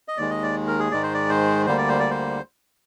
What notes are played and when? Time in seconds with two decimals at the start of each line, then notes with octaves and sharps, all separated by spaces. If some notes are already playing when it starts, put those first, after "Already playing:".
0.08 D#5
0.17 D#2 D#3 G#3 D5
0.30 D#5
0.43 D5
0.67 A#4
0.80 G#4
0.92 G#2 D#3 G#3 D5
1.03 C5
1.14 D5
1.29 C5
1.66 D2 D3 G3 A#3 C5
1.78 D5
1.89 C5
1.99 D5
2.10 C5